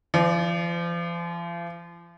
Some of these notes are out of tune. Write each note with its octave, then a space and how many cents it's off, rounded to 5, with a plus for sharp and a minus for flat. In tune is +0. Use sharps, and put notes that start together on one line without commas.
F3 -40 D5 +0